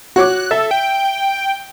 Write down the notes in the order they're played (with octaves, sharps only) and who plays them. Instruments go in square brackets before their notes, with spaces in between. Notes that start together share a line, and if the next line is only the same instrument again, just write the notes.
[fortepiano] F#4 C#5 D6 [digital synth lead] F#6
[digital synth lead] A4 [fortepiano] E5
[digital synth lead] G5